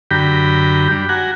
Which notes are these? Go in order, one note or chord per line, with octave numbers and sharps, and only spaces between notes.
F#2 D3 G4 G5 A#5 B5
G3 D4
F#4 F#5 G#5 A#5